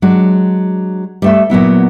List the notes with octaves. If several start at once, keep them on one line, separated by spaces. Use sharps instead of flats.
F#3 G#3 D4 F#4
G3 A3 E5
A#2 F#3 B3 E4